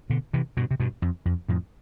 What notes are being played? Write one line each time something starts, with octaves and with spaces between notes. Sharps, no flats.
B2 D3
C3 E3
G2 B2
C3
G2 B2
F2
F2
F2 A2